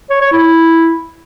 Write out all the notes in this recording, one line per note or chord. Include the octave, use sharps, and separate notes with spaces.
C#5
C#5
E4